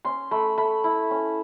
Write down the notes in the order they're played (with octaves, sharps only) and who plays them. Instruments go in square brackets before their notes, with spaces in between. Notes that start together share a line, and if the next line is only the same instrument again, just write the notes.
[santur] C#4 C6
A3 B5
A3 B5
E4
C#4